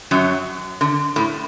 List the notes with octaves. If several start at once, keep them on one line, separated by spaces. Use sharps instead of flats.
F#2 F#3
D3
A2